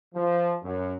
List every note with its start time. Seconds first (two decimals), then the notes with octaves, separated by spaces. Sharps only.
0.14 F3
0.63 F#2